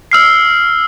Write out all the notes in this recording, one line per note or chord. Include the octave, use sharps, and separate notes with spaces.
E6 F6 C7